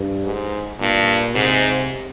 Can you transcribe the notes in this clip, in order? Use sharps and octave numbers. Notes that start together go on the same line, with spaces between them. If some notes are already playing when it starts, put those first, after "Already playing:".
Already playing: G2
G#2
G2 A#2
G#2 C3